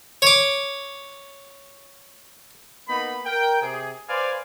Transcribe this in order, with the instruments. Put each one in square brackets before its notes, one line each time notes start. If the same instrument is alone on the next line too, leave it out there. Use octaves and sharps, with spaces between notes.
[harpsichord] C#5 D6
[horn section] A#3 B3 D#4 B5
A#4 G5
C3 G#4
B4 C5 D5 F5 G#5